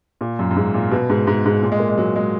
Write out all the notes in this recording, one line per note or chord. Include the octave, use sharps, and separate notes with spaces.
A#2
F#2
F#2
G#2
A#2
B2
G#2
G#2
G#2
A#2
G#3
A#3
G#3
F#3
G#3